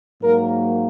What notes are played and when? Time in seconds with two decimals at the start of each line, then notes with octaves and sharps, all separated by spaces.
0.21 G#2 F#3 A#3 A#4